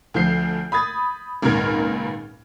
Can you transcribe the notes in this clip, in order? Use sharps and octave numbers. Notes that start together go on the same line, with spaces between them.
D2 F3 G6 C7
B5 D#6 G#6 A6
G#1 C#2 A#2 A#4 F6 G#6